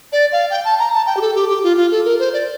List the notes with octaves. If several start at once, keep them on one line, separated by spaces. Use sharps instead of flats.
D5
F5
G5
A5
A#5
A5
G5
G4
A4
G4
G4
F4
F4
A4
A#4
C5
D5